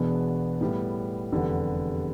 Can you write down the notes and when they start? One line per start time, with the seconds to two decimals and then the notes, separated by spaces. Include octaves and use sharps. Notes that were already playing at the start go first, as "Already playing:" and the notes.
Already playing: E1 E2 B2 B3 D4
0.61 A2 G3 B3
1.32 F1 E2 D3 G3 B3